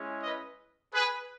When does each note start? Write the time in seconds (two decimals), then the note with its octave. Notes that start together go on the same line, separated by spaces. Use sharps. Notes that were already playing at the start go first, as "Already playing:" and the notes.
Already playing: G#3 C#4 E4
0.23 B4 D#5
0.93 G#4 B4